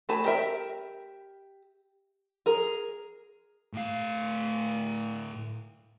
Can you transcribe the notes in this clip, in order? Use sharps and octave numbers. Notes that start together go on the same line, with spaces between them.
A3 F#4 G#5 A5 B5
G4 A#4 E5
G#4 A#4
A2 F5